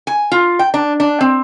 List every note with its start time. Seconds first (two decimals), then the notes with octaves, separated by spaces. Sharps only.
0.07 G#5
0.32 F4
0.59 G5
0.74 D4
1.00 D4
1.21 C4